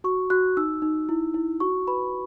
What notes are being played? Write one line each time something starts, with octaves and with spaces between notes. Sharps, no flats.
F#4 C#6
F#4 F#6
D#4 E6
D#4
E4
E4
F#4 C#6
B4 B5